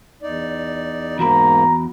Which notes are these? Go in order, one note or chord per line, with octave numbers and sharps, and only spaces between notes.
E2 D#4 D5
E2 G#2 A#3 F#4 A#5 B5